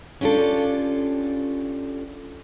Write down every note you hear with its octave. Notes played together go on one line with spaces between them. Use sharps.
C#4 D4 F4 G4 A4